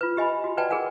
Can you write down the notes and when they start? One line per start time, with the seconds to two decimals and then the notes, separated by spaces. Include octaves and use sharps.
0.01 F4 B4
0.17 G4 D#5 G#5 B5
0.44 F#4
0.57 B4 D5 D#5 F#5 G5 A5
0.70 G#4 A#4 B4 F#5 G#5